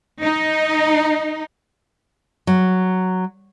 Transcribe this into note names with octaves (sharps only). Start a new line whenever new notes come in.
D#4
F#3